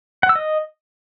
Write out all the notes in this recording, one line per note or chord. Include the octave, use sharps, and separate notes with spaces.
F#5
E6
D#5